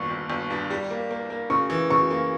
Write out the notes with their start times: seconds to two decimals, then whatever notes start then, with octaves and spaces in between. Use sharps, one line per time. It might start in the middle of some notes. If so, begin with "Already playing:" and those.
Already playing: G1 D#2 C#6
0.10 G1
0.30 G1
0.50 G2
0.70 G3
0.91 A#3
1.11 A#3
1.30 A#3
1.50 C#3 C#6
1.70 E3
1.90 C#3 C#6
2.11 A#3